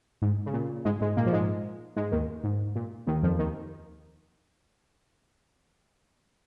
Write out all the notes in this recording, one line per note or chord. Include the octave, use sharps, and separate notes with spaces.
G#2
C#3
A#2
G#2 G#3
G#2 G#3
A#2 A#3
F3
G#2 G#3
G#2 G#3
D#2 D#3
G#2
A#2
D#2 D#3
F2 F3
D#2 D#3